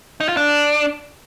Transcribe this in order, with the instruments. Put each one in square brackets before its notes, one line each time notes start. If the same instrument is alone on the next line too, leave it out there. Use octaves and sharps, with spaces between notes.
[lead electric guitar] D#4
F4
D4